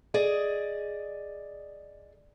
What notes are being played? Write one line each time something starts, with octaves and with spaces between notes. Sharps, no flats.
G#4 D5 D#5